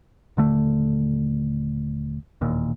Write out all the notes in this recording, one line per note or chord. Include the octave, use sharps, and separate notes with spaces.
D#1 D3 A3
E1 D#2 A#2